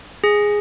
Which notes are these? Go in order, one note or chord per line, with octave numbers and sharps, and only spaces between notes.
G#4